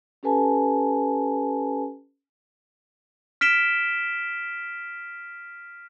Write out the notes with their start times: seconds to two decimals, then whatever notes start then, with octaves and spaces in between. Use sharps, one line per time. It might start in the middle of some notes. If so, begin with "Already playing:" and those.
0.23 C#4 G4 A4 B4 G#5 A5
3.41 F6 B6 D7 E7 G7